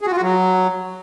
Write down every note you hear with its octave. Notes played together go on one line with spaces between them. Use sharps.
G#4
F#4
F4
F#4
F#3